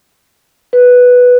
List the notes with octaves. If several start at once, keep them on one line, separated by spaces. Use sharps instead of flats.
B4